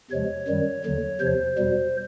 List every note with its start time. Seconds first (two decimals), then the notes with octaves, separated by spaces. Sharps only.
0.10 E2 C3 F3 G#3 C#5
0.48 F#2 D#3 G3
0.84 D#2 D3 F#3
1.20 E2 C3 F3 C5
1.58 E2 B2 G3